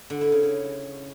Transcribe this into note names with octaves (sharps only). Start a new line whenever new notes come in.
D3
E4
C#3
C#3